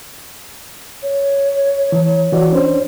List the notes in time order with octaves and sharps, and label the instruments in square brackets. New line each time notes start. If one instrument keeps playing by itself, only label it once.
[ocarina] C#5
[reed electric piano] E3
E3 F#4 D5
C#4 D4 C5